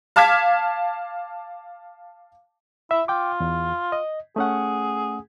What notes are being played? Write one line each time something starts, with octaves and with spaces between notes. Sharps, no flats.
F5 A5 D6 F6 G#6 B6
E4 E5
F4 G5 D6
E2
D#5
A3 C#4 G#4 F#5